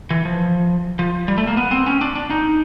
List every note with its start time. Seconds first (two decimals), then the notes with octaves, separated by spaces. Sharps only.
0.10 E3
0.25 F3
0.99 F3
1.28 G3
1.38 A3
1.47 A#3
1.57 B3
1.71 C4
1.86 C#4
2.01 D4
2.15 D4
2.30 D#4